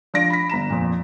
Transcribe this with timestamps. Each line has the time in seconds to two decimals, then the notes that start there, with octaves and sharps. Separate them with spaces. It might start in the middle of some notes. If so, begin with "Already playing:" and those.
0.14 F3 D4 D5 A#6 D7
0.30 B5 B6
0.49 G1 A#5 E7
0.70 F2 A#2